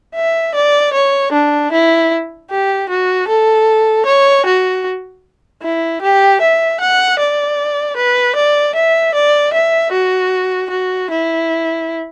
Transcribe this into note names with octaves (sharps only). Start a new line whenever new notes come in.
E5
D5
C#5
D4
E4
G4
F#4
A4
C#5
F#4
E4
G4
E5
F#5
D5
B4
D5
E5
D5
E5
F#4
F#4
E4